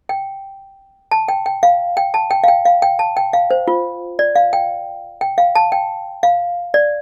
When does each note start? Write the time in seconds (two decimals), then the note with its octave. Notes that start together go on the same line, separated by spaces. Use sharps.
0.09 G5
1.11 A5
1.28 G5
1.46 G5
1.63 F5
1.97 G5
2.14 A5
2.31 G5
2.44 F5
2.48 G5
2.65 F5
2.82 G5
2.99 A5
3.17 G5
3.33 F5
3.51 C5
3.68 F4
4.19 D5
4.35 F5
4.53 G5
5.21 G5
5.38 F5
5.55 A5
5.72 G5
6.23 F5
6.74 D5